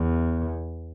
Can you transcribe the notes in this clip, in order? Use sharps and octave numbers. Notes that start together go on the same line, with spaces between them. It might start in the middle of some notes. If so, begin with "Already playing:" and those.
Already playing: E2